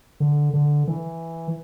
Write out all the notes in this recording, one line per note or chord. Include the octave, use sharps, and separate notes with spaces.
D3
D3
E3